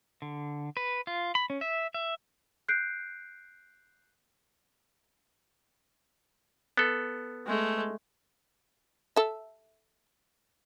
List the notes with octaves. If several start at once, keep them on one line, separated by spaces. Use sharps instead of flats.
D3
B4
F4
B5
C#4
E5
E5
F#6 G6 C7 D7
B3 A4
G#3 A3
A4 E5